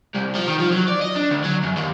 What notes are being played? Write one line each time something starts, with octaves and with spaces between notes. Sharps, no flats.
C2
F3
D#3
F3
F#3
D5
D#5
D4
D2
F#3
F#2
D#2